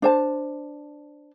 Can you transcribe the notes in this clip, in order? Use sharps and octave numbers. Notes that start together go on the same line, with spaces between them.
D4 C5 A5